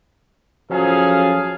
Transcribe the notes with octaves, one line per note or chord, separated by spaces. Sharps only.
F3 F#3 C#4 G#4 A4 F5